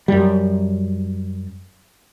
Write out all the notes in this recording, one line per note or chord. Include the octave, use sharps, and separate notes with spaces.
F#2 G3